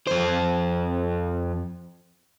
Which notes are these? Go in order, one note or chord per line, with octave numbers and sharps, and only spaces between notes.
F2 C5